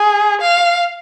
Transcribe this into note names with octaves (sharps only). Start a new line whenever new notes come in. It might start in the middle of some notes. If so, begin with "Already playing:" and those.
Already playing: G#4
F5